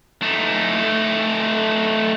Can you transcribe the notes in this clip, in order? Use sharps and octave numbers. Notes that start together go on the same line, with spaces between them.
A3 D#4